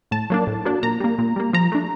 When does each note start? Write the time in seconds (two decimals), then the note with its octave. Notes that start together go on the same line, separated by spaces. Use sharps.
0.11 A2 A5
0.30 F#3 A#3 D4
0.47 A2
0.65 F#3 A#3 D4
0.83 A#2 A#5
1.00 G3 A#3
1.19 A#2
1.36 G3 A#3
1.53 F3 A#5
1.72 A3 D4